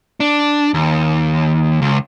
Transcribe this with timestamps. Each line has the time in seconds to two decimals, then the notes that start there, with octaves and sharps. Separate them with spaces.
0.20 D4
0.74 D#2
1.82 C#2